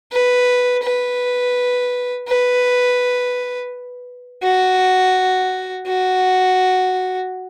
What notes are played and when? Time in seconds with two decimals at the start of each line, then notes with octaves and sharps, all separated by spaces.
0.12 B4
0.83 B4
2.28 B4
4.43 F#4
5.87 F#4